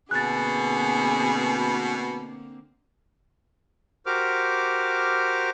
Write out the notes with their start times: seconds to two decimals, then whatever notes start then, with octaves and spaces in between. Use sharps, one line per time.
0.11 B2 D3 A#3 C4 G#4 F#6 A6
4.06 F#4 G4 A#4 C5 D6 F6